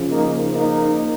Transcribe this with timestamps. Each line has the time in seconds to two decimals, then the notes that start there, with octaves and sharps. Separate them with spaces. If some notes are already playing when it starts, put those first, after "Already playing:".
Already playing: C#3 F3
0.10 A#3 D#4
0.53 A#3 D#4